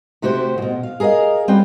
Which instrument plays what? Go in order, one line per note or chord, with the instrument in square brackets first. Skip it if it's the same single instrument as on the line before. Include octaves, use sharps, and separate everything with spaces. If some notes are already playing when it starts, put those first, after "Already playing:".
[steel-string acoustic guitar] C3 A3 F#4 G4 C5
E2 B2
F5
G#4 A#4 D5 D#5 F5
G3 C4 C#4 F#4 G5